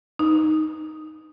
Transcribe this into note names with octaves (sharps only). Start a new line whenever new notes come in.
D#4